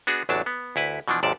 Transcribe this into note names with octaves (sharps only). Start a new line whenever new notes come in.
B3 D4 F#4 G#4
A1 E2 F#3 D4 A5
B3
D2 E4 B4
B2 E3 F3 D4
G#1 D#2 G#2 C3 D5 A5